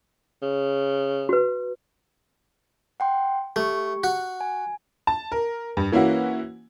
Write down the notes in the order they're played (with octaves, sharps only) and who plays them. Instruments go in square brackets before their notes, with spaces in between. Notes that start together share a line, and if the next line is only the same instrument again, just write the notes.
[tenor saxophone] C#3
[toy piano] F#4 B4
[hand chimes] F#5 G5 C6
[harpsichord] A3 [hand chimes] G4 C#6
[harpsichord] F#4
[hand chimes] G#5
[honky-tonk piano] A5
A#4
G2
E3 A#3 C#4 E4 F#4